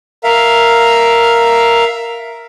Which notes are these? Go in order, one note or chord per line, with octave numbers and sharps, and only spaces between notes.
A#4 E5 F5